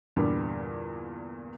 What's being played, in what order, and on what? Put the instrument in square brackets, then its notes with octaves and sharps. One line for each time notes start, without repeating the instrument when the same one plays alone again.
[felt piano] E2 G2 A#2 D3 G3